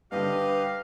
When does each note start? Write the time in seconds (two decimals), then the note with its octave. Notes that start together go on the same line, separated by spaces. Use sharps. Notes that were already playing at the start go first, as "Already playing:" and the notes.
0.12 G2 D3 G4 B4 D#5 F5